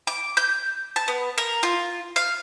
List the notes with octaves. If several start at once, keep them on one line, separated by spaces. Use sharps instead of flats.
D6
G6
A5
B3
A#4
F4
F5